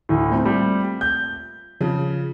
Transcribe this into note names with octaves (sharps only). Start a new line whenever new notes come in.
D2 A2
A#2 A3 C4
G3
G6
C#3 F3